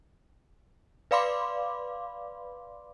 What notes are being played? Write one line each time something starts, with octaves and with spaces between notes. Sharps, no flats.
B4 D5 F5 B5 C6 D6